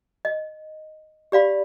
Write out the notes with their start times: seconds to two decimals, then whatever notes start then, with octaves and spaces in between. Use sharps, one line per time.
0.25 D#5
1.32 G4 D5 F5 B5